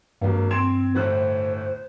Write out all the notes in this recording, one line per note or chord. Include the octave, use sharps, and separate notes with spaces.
G#1 G2 F#3 A#3
C4 C6 G#6 E7
G1 A2 C5 F#6